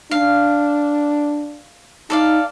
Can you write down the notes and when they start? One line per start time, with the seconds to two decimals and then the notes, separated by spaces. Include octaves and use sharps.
0.11 D4 F5
2.10 D#4 A4 D5 F5